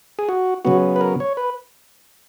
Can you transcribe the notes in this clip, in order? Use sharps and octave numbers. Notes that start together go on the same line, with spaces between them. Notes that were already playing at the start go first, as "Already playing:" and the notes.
G#4
F#4
C#3 F#3 B3 F#4
B4
A#4
C#5
B4